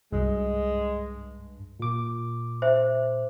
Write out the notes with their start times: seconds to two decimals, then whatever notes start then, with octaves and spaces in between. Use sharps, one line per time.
0.13 C2 G2 G#3
1.80 A#2 D6
2.62 C5 E5